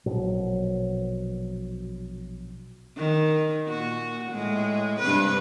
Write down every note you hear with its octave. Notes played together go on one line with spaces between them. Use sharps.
A#1 B2 F#3
D#3
A#2 F#4
A2 G#3
G2 C3 B4